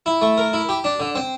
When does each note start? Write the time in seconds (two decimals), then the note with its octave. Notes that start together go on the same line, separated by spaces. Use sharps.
0.06 E4
0.22 A3
0.38 A#4
0.53 E4
0.69 G4
0.84 D4
1.00 D3
1.15 C4